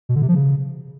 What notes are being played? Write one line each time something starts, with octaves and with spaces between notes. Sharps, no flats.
B2
D3
C3
F3
C#3